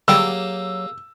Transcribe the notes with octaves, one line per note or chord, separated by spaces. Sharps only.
D3 F#3 G3 A#3 G4 G#4 G5 E6